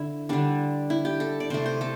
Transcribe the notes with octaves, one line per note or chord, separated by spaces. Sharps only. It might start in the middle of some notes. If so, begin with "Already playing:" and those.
Already playing: D3 E4
D3 G3 D4
E4
G4
A4
D5
C3 A3 C5
C5
A4